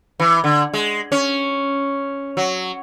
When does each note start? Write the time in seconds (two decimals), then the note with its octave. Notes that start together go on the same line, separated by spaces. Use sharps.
0.20 E3
0.44 D3
0.74 G#3
1.12 C#4
2.37 F#3